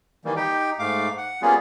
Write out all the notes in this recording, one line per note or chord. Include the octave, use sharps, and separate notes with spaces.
D#3 E3 G3 A#3
D#4 G4 G5
G#2 A3 F5 D6
F#5
G3 A#3 B3 C#4 F4 G#4